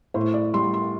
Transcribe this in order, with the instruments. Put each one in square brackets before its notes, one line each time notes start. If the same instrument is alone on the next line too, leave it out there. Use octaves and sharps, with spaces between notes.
[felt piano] A2 C5
D5
G3 C6
C6